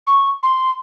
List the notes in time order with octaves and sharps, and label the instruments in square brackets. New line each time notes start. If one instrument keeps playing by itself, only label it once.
[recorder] C#6
C6